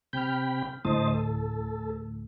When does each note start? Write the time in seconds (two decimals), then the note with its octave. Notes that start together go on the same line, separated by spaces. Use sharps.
0.13 C3 G5 B5 F6 G6
0.85 D2 A2 C5 D#5 A5
1.14 A4